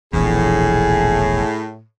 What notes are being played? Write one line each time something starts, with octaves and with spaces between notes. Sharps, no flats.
E1 A#1 E2 A2 G#4